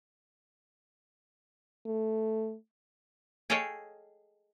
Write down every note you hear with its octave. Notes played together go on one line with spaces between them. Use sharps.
A3
G#4 A4 C#5 D#5 F5 G5